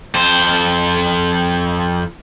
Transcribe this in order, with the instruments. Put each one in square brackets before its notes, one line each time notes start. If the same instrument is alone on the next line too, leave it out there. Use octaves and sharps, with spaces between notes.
[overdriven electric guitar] F2 C5